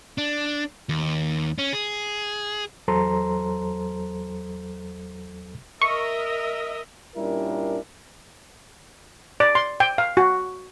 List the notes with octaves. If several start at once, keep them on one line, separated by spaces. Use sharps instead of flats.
D4
D#2
C#4
G#4
E2 F#3 A4 C5 A#5 C6
A#4 D#5 E5 C#6
A#2 G3 C#4 D4 E4 A#4
D5
C6
G5
F5
F#4